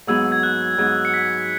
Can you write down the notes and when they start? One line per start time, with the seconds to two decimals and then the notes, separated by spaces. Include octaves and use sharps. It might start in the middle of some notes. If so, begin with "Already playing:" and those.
0.07 G#2 F#3 B3 G#4 E6
0.32 G#6
0.43 F#6
0.78 G#2 F#3 B3 G#4
1.05 C#7
1.14 B6